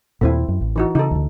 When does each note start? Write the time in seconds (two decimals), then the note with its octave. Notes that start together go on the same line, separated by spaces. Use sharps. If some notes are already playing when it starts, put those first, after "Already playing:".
0.21 D#2 A#2 A3 C4 E4
0.48 F#2
0.61 A1
0.76 E3 D#4 F#4
0.95 C#3 D#4 A4
1.11 D2 D3